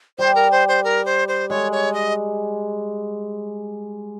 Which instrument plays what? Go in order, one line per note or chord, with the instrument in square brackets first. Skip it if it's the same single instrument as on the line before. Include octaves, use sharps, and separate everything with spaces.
[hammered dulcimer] G3 [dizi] C5
[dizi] A#4
C5
C5
A#4
C5
C5
[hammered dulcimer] G#3 [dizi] C#5
[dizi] C#5
D#5